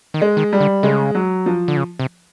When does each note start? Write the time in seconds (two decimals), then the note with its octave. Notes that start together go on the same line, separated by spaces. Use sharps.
0.14 D#3
0.21 G#3
0.37 D#3
0.53 G3
0.60 D3
0.83 C#3 G#3
1.15 F#3
1.46 F3
1.68 D3
1.77 C#3
1.99 C3